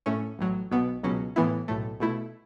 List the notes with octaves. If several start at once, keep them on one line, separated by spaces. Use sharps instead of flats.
A2 A3 C#4
A1 A2 F#3
B1 B2 B3
C#2 B2 F#3 C#4
A2 E3 B3 E4
B1 A2 A3
B2 A3 E4